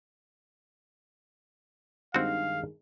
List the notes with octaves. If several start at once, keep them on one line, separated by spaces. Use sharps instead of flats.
G2 D#3 G#3 C4 F#4 F5